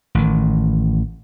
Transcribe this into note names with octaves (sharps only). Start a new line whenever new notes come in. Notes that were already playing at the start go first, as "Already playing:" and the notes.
A1 D#3